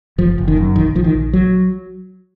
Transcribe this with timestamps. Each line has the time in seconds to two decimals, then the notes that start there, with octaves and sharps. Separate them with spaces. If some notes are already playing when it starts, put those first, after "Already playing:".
0.18 F#1 F3
0.38 F#1
0.48 D#3
0.57 F#2
0.76 A#1 D#3
0.95 A#1 F3
1.04 D#3
1.14 A#1
1.33 F#3